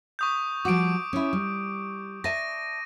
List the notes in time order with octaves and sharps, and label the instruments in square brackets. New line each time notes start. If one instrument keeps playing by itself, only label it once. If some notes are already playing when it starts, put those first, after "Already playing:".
[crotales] C#6 D#6 G6
[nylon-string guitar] F3 G3 F#4 [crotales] D6 D7
[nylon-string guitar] C#4 E4
G3
[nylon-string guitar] D5 E5 A5 [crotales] A#6 D#7